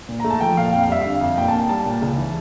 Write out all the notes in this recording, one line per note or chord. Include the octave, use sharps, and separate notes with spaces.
A#2
A3 A#5
A5
F3 G5
A#2 F5
F2 G5
F5
G3 E5
D3 F5
F2
A#2 G5
A5
A#3
G5
G3 A5
A#2
C#2
E3